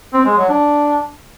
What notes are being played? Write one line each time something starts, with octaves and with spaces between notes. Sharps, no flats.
C4
G#3
F#3
D4